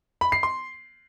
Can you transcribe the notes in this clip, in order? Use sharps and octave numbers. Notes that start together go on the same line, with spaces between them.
B5
C7
C6